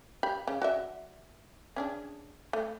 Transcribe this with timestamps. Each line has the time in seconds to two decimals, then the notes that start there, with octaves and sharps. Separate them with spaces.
0.23 G4 B5
0.47 C#3
0.62 F#4 D5 E5
1.76 C#4 D4 G#4
2.53 A3